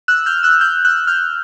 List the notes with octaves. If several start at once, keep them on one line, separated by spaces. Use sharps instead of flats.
E6 F#6
F6 G6
E6 F#6
F6 G6
E6 F#6
F6 G6